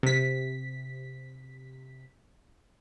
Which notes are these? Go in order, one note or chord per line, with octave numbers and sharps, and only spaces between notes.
C3 B6